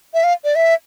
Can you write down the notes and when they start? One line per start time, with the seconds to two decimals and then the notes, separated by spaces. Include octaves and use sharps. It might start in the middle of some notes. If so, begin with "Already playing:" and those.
0.14 E5
0.24 F5
0.44 D5
0.55 E5